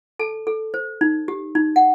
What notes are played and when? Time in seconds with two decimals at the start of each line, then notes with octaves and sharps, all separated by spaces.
0.19 A4 A5
0.47 A4
0.74 C5
1.01 D#4
1.28 G4
1.55 D#4
1.76 F#5